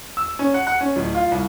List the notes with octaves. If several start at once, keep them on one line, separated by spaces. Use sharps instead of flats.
E6
C#4
F#5
F#5
C#4
D1
F4
C2